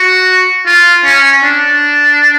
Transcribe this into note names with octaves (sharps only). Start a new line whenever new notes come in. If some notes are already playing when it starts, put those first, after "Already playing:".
Already playing: F#4
F4
C#4
D4